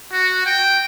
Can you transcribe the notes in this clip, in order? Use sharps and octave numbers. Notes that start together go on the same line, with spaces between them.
F#4
G5